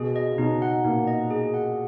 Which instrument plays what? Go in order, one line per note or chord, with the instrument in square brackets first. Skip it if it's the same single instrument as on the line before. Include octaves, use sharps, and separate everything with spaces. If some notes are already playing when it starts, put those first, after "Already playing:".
Already playing: [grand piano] B2 [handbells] G#4
[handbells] D#5
[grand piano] C#3
[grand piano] B2 [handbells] D#4
[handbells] F#5
[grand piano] A#2 [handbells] D#4
[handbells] D#5
G#4
F#5